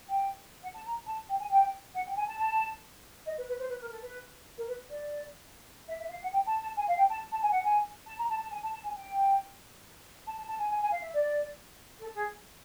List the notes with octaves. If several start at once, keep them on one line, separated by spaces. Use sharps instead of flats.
G5
F#5
A5
A#5
A5
G5
G#5
G5
F#5
G5
G#5
A5
A5
D#5
B4
B4
C5
B4
A#4
A4
B4
A#4
B4
D5
E5
E5
F5
F#5
G5
A5
A5
G#5
F5
G5
A5
A5
G#5
F#5
G#5
A5
A#5
A5
A5
G#5
A5
A5
G#5
G5
A5
A5
A5
G#5
G#5
G#5
F5
E5
D5
A4
G#4